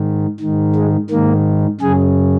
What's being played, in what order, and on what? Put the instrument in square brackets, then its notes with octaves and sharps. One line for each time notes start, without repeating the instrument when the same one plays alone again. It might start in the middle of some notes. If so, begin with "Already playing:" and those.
Already playing: [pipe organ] G#2 D#3
G#2 D#3
G#3
G#2 D#3 A#3
F#2 C#3 G#4